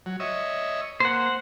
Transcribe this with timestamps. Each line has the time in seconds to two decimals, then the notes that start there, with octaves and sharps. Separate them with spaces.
0.06 F#3
0.20 C#5 D#5 E5
1.00 A#3 C5 F#5